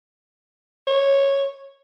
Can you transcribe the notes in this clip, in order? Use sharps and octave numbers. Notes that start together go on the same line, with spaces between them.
C#5